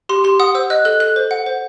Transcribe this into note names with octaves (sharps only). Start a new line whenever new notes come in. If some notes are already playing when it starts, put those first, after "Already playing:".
G4 C6
G4 C6
F#5 D#6
C5 E6
D#5 F#6
A4 F#6
A4 F#6
C5
F#5
C5